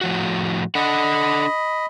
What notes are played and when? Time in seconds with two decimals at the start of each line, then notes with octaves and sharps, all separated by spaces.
0.01 A2 F3 F#4
0.75 D4 A4 D#5 F#5 B5